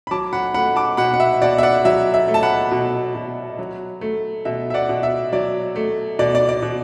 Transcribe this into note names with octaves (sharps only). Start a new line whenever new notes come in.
B5
F#3 A5 D6
F#5 B5
A3 F#5 B5
A5 D6
B2 F#5 B5
F#5
E5
B2 D5 F#5
E5
D5 F#5
F#3 E5
E5
A3
A5
F#5 B5
B2
B2
F#3
A3
B2 E5
E5
D5 F#5
B2
E5
F#3 D5
A3
B2 D5
D5
D5
B2